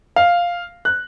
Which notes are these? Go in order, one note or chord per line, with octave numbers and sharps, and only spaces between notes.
F5
F#6